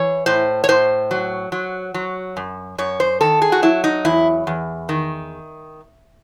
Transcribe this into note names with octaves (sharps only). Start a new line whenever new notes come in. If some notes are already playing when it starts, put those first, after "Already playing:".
Already playing: E3 C#5
A2 C5
C#5
A2 C5
F#3
F#3
F#3
F#2
F#2 C#5
C5
D#3 A4
G#4
F#4
F#3 E4
D#4
E2 E4
E2
D#3